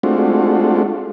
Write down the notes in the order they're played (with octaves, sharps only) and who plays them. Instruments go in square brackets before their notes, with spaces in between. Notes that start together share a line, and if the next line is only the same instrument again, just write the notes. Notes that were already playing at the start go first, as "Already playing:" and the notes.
[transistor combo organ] G#3 A3 C4 D4 F4 F#4